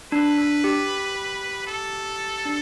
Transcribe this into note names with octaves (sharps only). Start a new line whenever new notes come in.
D4 B4
D4
G4
A4
D4